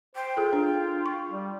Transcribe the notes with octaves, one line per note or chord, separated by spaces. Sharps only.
C5 G5
F4 G#4 A4
D4
C#6
G3